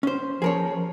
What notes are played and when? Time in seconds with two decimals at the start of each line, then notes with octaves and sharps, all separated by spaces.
0.03 C#4 C5
0.42 F3 G#4 A#4 C#5